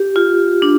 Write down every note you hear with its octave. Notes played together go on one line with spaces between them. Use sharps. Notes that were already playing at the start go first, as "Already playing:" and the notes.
Already playing: G4
F4
D4